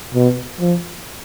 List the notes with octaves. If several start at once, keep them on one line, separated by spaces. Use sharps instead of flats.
B2
F3